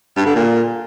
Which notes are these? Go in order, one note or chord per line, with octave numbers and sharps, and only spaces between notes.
G2
D3
A#2